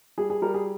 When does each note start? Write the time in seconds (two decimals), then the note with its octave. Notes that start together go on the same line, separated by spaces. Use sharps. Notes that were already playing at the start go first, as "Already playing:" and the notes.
0.18 G3 G#4
0.30 G#4
0.42 G3 A#4
0.54 G#4